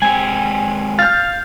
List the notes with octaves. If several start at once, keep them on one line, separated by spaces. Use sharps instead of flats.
G#3 C4 G4 G#5
F5 F6 G6 A6